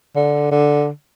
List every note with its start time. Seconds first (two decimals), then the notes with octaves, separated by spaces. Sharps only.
0.15 D3
0.51 D3